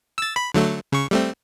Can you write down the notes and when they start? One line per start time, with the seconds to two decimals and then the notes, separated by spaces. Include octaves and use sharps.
0.18 E6 A6
0.36 B5
0.54 D3 F#3 A3
0.92 C#3 C#6
1.11 G3 A3 C4